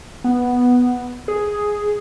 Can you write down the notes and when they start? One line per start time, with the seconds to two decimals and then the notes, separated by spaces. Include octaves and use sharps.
0.24 B3
1.28 G#4